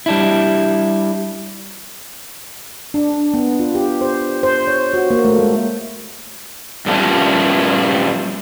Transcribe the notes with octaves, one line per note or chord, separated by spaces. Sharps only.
G3 D4 E4
D4
B3
F4
G4
C5
C5
C#5
F#4
A#3
A3
G#3
G2 A#2 F3 G3 C#4 E4